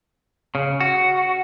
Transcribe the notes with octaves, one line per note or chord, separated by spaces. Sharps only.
C#3
F#4